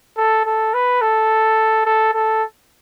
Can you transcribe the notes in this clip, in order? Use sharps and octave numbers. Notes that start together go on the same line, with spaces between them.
A4
A4
B4
A4
A4
A4